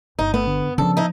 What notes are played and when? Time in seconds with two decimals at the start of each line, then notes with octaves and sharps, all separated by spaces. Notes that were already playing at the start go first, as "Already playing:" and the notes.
0.19 G1 D#4
0.34 A3 B3
0.47 D3
0.78 C#3 F3 D4 A4
0.97 D#4 E4